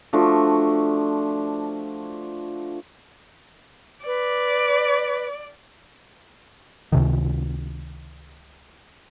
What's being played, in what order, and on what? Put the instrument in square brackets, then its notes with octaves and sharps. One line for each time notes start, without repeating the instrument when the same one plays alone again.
[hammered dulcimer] F3 A3 D4 F#4
[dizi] B4 [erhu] D5
[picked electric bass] C#2 C3 D#3